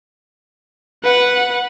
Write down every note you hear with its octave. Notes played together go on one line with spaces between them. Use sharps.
B4 F#5